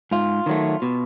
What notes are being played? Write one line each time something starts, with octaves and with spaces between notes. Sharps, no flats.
G#2 F4
D#3 F#3 A3
B2